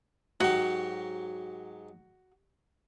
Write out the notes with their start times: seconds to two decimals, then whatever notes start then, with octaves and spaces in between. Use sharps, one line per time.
0.40 G#2 F#3 F#4 G4